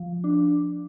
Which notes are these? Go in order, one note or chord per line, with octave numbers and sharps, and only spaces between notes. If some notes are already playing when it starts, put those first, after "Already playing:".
Already playing: F3
D4